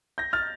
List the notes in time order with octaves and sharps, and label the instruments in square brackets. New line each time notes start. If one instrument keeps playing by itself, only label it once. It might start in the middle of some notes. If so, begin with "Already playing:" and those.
[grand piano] G6 A#6
F6 A6